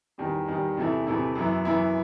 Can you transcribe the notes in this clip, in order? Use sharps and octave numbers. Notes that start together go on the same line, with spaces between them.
E2 D#3 G3
E2 D#3 G3
E2 C3 E3 A3 E4
E2 C3 E3 A3 E4
F#2 E3 B3 E4
F#2 E3 B3 E4